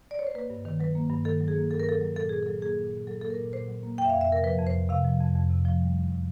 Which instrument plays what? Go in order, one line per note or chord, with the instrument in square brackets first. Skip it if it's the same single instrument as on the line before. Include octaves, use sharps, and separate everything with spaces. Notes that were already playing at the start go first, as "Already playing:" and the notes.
[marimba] D5
C#5
C5
A#3 B4
G2
D#3
F#3 B4
A#3
G2
D#3 A4
F#3
G#4
A#3
G2 A4
A#4
D#3 A4
F#3
A#2 A4
A#2 G#4
F#3 A4
A#3 G#4
A#2
A#2
F#3 A4
A#3 A4
A#4
A#2
A#2 C5
F#3
A#3
F2 G5
E5
F2 F5
E5
C3 A#4
F3 B4
F2
C5
F2
C3 F5
F3
F2
F2
C3
F3
G3
E2
C3